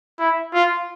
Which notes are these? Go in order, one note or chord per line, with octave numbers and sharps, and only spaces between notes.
E4
F4